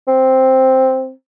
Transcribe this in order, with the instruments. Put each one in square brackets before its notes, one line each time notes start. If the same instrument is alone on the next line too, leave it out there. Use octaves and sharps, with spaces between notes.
[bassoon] C4